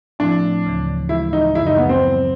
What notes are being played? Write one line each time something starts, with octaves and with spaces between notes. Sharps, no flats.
A2 F3 A3 C4 D4 E4
D2 C#3 E3
A2 E3 G#3 E4
D#4
F#2 C#3 F#3 E4
D#4
B3
C4
C#3 F#3 B3 E4